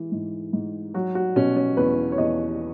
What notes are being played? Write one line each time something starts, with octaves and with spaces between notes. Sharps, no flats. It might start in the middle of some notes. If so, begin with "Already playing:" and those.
Already playing: E3 G#3
G#2
G#2
F#3 F#4
F#4
B2 C#4
C#4
E2 B4
C#5
E2 D#5